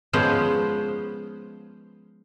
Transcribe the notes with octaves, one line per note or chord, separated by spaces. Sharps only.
F3 G#3 B3 C#4 C5